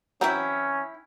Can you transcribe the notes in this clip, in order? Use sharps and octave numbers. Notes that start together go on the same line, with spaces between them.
E3 F#3 C4 C#4 E4 G5 A#5